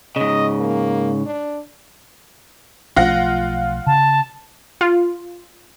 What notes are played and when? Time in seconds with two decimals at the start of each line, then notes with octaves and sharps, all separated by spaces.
0.16 G#2 C#3 D#5
0.60 A#3
1.26 D4
2.96 B1 F3 A3 F4 F#5 A#6
3.87 C#3 A5
4.81 F4